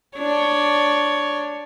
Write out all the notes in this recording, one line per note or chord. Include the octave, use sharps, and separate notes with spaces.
D4 C#5